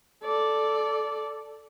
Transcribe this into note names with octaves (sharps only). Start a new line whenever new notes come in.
A4 D5